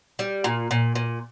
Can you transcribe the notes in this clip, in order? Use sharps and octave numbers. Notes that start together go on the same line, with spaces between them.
G3
A#2
A#2
A#2